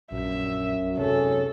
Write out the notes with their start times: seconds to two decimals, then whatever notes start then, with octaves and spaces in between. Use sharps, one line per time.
0.12 A#1 F#2 E5
0.98 C3 F#3 G#4 A4 C#5